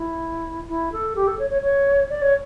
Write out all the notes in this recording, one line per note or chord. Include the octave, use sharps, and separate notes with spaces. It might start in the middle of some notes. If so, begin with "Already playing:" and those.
Already playing: E4
E4
A4
G4
A4
C#5
C#5
C#5
D5
C#5